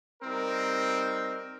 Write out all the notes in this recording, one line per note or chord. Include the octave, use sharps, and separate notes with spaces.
G3 C4 D#4 A#4